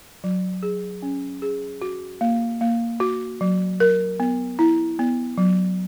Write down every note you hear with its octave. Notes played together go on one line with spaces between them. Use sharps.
F#3
G#4
C#4
G#4
F#4
A#3
A#3
F#4
F#3
A#4
B3
E4
B3
F#3